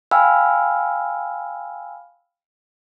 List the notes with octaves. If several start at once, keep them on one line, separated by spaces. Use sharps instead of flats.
F5 G5 G#5 B5 E6 F6